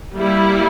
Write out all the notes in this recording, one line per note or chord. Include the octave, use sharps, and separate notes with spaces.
G3 A#3 E4